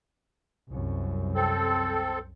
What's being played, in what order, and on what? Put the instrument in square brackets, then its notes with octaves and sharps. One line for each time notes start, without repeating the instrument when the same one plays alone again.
[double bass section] C2 F#2
[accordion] C4 A4